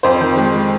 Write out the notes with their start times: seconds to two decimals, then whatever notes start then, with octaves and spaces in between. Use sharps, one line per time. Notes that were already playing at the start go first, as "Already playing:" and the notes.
0.03 F2 C5
0.21 D#3
0.37 G#3